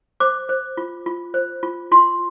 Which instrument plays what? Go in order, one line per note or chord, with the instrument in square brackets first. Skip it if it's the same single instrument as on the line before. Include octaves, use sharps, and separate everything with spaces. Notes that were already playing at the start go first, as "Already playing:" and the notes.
[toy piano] C5 D6
C5
F4
F4
C5
F4
F4 C6